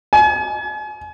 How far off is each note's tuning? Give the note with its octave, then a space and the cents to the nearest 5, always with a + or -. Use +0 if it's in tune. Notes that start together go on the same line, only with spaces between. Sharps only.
G#5 +40